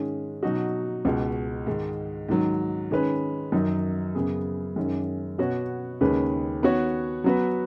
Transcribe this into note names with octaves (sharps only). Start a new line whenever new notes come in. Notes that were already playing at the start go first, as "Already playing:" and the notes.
Already playing: G#2 D#3 G#3 C#4
B2 F#3 D#4 F#4
C#2 B2 G#3
G#2 D#3 G#3
G#2 D#3 F#3
D#3 G#3 C#4 B4
F#2 D#3 F#3 D#4
F#2 C#3 B3 G#4
F#2 D#3 G#3 C#4
B2 B3 F#4 C#5
D#2 C#3 G#3 C#4 B4
D#3 B3 F#4 C#5
F#3 B3 F#4 B4